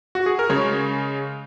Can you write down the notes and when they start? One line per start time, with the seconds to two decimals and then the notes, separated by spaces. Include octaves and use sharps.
0.15 F#4
0.26 G#4
0.39 A#4
0.50 C#3 G#3 C#5